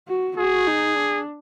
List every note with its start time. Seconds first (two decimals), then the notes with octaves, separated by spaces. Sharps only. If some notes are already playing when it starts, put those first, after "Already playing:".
0.08 F#4
0.37 F#4 G#4
0.67 D#4
0.96 D4